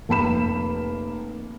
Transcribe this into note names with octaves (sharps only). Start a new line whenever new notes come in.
F1 A#3 B5 E7